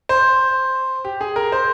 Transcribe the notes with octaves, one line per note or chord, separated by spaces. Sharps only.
C5
G4
G#4
A#4
C5